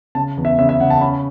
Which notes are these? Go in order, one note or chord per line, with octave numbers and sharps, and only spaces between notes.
C#3 A5
E2
E5
C#3 E5
E5
C#3 F#5
A5
C#4 B5